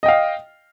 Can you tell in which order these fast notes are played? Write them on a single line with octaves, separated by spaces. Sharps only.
D#5 G5 F5